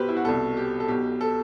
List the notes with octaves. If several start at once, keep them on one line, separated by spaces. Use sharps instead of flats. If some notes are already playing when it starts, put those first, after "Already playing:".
Already playing: B1 B2 G4 B4 C5
E4
F#4
C2 B2 A4
G4
A4
B1 B2 G4
A4